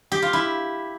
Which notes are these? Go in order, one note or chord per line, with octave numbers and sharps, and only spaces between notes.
G4
F4
E4